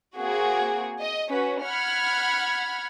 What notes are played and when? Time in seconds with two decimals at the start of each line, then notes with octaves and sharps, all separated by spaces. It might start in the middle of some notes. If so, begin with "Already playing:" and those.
0.18 A#3 C4 F#4 G#4
1.00 D#5
1.31 C#4 F#4 B4
1.63 F#5 B5 F6 G#6